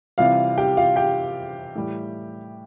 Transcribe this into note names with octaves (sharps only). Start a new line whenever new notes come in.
C3 E3 G3 F4 F5
G4 G5
F4 F5
G4 G5
A2 E3 G3